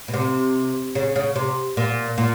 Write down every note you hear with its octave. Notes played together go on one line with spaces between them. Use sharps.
B2
C3
C#3
C#3
C3
A#2
A#2